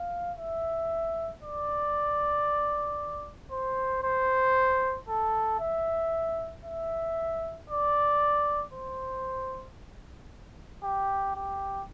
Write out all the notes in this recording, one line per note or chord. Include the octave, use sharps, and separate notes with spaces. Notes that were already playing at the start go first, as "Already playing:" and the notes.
Already playing: F5
E5
D5
C5
C5
A4
E5
E5
D5
C5
G4
G4